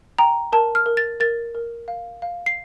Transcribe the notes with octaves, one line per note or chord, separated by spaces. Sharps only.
G5 A#5
A#4 A5
F6
A#4
A6
A#4 A6
A#4
F5
F5
C7